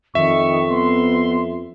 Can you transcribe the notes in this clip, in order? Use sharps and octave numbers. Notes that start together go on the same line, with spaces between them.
F2 D#3 E5 C#6
B3 C6